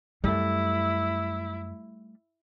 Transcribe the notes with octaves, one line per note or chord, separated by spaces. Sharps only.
F#2 G3 A3 E4